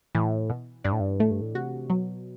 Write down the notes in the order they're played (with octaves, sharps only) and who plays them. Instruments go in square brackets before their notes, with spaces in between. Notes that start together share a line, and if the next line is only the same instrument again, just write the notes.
[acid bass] A2 [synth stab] E3
[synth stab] B2
[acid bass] G2 [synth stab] D4
[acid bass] A2
G2
[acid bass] A2 [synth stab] A3
[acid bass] G2
A2
[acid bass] C3 [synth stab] F#4
[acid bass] B2 [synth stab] F#3